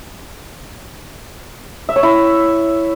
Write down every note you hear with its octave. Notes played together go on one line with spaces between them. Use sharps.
E5
C#5
E4